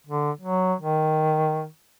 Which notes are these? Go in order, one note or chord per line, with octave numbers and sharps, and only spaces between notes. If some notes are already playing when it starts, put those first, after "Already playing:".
D3
F#3
D#3